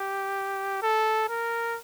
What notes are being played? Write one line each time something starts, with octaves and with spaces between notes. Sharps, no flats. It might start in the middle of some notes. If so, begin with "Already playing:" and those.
Already playing: G4
A4
A#4